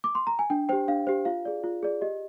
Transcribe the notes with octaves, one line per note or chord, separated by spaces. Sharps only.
D6
C6
A#5
G#5
D4 G5
G4 C5 G5
D4 F5
G4 C5
F4 F5
G#4 D5
F4
G#4 D5
G4 D#5